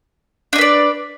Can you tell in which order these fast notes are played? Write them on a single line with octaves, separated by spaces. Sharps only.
D4 D#5 B4 D5